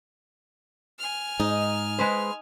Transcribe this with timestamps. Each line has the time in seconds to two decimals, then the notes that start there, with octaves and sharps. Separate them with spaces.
0.99 G#5 F6
1.40 G#2 D#4
1.98 G#3 B4 C5